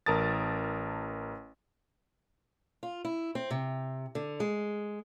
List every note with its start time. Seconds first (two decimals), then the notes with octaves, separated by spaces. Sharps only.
0.06 A1 A#4 A5 D#6 A6
2.83 F4
3.05 E4
3.35 C4
3.51 C3
4.15 D3
4.40 G#3